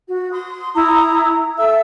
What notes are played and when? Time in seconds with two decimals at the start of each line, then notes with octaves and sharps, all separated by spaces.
0.09 F#4
0.32 C6 D#6
0.74 E4 A#5 D#6
1.57 A4 E5 E6